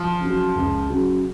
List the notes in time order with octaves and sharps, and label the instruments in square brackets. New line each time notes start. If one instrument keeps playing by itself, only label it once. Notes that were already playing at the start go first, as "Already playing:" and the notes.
Already playing: [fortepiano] F3
[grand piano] C#3
F#3
C#2
C#3 F#3